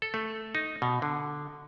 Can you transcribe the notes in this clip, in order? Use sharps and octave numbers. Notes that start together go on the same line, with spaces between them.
A4
A3
D#4
B2
D3